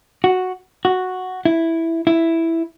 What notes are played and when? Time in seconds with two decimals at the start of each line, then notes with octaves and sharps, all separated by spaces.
0.24 F#4
0.85 F#4
1.45 E4
2.07 E4